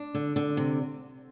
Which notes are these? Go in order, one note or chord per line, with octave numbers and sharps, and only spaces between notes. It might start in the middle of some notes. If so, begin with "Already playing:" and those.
Already playing: D4
D3
D3
C3